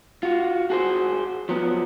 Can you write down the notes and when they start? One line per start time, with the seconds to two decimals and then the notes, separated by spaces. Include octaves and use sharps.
0.23 F4 F#4
0.70 F#4 G#4 C5
1.49 F3 F#3 B3